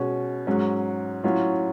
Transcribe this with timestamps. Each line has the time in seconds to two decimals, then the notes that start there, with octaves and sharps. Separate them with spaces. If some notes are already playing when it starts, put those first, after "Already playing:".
Already playing: B2 G#3 C#4
0.47 G#2 F#3 C#4 F#4
1.24 A2 F#3 C#4 F4